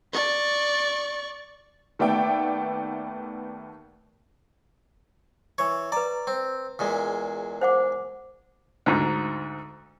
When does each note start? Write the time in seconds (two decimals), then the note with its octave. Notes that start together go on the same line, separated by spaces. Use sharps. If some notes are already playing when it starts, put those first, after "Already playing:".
0.13 D5 C#6
1.99 D#2 A3 B3 D5 E5 G5
5.58 E3 C#5
5.92 B4 D5 A#5
6.27 C4
6.79 E2 A#2 G#3
7.61 C5 F#5 D6
8.86 D2 G#2